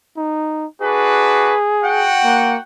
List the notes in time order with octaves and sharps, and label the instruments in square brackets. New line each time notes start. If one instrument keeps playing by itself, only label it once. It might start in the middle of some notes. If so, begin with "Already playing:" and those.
[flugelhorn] D#4
[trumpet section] D4 F#4 B4 [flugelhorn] G#4
[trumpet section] F#4 F#5 G5
[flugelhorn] A#3